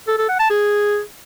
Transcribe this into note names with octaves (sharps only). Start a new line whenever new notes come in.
A4
A4
F#5
A5
G#4